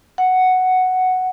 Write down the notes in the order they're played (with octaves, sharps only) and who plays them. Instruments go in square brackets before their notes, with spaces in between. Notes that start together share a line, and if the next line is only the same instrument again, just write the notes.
[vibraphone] F#5